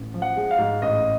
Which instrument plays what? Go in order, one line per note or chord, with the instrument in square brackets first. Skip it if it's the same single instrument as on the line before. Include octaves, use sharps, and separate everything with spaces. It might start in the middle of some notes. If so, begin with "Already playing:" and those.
Already playing: [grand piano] A1
F3
F#5
G#3
F5
G#2
A1 D#5